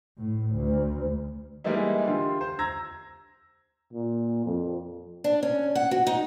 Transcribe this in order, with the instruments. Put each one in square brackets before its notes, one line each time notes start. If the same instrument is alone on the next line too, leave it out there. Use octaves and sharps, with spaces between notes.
[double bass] A2
D2
[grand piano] E3 G3 G#3 A#3 D#4 E4
D3 F4 G4 C6
C5
A#5 E6 G#6 A#6
[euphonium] A#2
F2
[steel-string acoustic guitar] D4
C#4
F#5
F#4
D#4